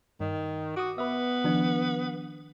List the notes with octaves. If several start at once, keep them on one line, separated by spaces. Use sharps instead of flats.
G2 D#3
F#4 D6 D#6
B3 B4 E5
D#3 F3 D4